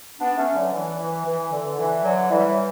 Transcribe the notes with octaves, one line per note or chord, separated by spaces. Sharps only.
B3 D4
A3 C#4
D3 F#3
E3
E3
E3
D3
E3
D3 F#3
E3 G3